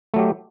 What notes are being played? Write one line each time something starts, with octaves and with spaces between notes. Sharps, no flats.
F#3 A3 G4